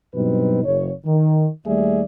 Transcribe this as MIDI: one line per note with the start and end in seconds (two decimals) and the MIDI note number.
0.14 0.62 43
0.14 0.62 47
0.14 0.62 54
0.14 0.62 60
0.14 0.62 63
0.14 0.62 71
0.64 0.90 30
0.64 0.90 73
1.05 1.45 51
1.66 2.02 39
1.66 2.02 55
1.66 2.02 57
1.66 2.02 68
1.66 2.02 74
1.66 2.02 76